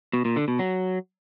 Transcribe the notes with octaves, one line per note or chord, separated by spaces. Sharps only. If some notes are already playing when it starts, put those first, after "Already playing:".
B2
A#2
D3
B2
F#3